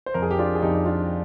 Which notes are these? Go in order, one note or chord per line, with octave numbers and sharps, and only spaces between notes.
C5
F2 A#4
G#4
G4
D4 F4
G#4
F2 D#4 G4
D4 F4